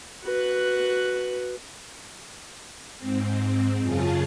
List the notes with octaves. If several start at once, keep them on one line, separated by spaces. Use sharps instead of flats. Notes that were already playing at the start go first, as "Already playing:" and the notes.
F#4 B4
G#2 C4
F#2 C#3 F4 G#4 A5